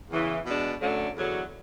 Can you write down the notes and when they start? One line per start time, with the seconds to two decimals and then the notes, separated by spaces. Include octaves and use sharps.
0.11 E2 C#3 E3
0.45 B2 G#3 D4
0.81 F#2 D3 F#3 A3 D4
1.16 E2 D3 F#3